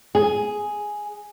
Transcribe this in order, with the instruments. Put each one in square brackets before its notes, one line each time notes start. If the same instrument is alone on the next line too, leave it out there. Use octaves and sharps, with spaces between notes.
[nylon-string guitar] G#4